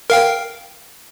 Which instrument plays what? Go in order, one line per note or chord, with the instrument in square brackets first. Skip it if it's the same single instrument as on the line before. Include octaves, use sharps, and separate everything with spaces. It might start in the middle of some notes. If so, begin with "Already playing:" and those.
[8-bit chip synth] A#4 F5 G5